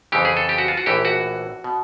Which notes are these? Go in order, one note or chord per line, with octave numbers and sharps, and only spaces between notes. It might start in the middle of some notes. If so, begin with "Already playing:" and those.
F2 C#3 E3 G4
G#4
A4
G4
F#4
F4
F#4
A#1 A2 E3 G4
F#4
B2